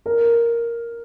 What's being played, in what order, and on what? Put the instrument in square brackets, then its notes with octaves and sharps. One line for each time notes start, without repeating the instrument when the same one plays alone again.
[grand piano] A#4